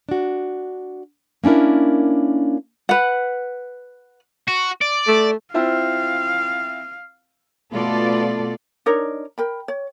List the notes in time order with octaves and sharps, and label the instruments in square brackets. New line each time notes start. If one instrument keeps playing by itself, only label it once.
[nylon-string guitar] D4 F#4
A#3 C#4 D4 E4 A#4
[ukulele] B4 F#5
[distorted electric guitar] F#4
D5
[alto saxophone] A3
[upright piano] C4 E4 F4 [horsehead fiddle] F5
[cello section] B2 A3 B3 F4 A4 D5
[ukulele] D4 D#4 A#4 C#5
A#4 G5 B5
C#5